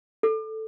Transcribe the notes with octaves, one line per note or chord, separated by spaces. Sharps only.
A4